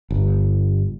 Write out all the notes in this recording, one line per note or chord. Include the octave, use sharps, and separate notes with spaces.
G1